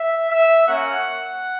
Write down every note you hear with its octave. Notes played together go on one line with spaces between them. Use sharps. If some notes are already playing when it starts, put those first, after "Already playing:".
Already playing: E5
E5
A#3 C#4 F#4 F#5